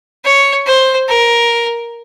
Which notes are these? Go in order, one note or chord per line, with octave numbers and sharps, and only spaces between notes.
C#5
C5
A#4